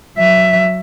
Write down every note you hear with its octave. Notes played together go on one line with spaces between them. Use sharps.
F#3 E5